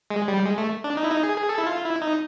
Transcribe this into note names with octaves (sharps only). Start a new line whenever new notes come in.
G#3
G3
G#3
A3
D4
D#4
E4
D#4
G#4
G#4
A4
E4
F4
E4
D#4